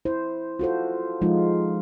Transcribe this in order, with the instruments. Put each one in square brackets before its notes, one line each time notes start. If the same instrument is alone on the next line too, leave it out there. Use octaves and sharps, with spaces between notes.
[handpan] E4 C5
F4 F#4 A4 C5
F3 G#3 D#4 F4